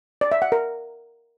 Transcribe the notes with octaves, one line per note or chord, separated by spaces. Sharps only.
D5
E5
F#5
A#4